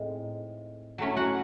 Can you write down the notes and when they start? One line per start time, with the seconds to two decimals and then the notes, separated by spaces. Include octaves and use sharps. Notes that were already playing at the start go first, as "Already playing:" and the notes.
Already playing: A2 G#3 C4 D#4
0.98 F#3 A3 C#4 E4
1.16 F#4 F#5